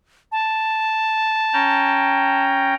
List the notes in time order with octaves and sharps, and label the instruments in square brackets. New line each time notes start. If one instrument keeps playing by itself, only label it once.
[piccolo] A5
[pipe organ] C#4 G5 A#5